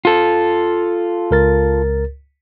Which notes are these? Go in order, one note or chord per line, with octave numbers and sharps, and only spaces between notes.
F4 A4
C#2 A#4 A6